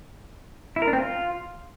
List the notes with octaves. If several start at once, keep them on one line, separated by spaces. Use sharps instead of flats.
E4
A#4
D4
C4
F4